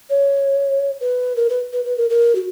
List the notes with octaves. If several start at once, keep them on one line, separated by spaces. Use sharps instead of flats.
C#5
B4
A#4
B4
B4
B4
A#4
A#4
F#4